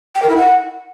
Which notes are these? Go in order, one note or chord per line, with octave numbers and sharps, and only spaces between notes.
G5
A#4
E4
F#5